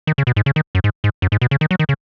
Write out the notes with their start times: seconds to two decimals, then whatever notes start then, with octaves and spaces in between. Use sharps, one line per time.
0.07 D#3
0.18 C#3
0.27 B2
0.36 G#2
0.46 C#3
0.56 D#3
0.75 F#2
0.84 G#2
1.04 G#2
1.22 F#2
1.32 G#2
1.42 B2
1.51 C#3
1.61 D#3
1.71 F#3
1.79 D#3
1.89 C#3